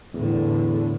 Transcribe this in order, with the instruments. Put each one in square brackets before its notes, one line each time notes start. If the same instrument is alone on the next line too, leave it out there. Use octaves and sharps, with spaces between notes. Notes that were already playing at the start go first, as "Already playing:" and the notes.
[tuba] E2 [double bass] A2 D3